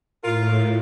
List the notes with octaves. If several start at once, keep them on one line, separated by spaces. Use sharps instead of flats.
A2 F4 A#4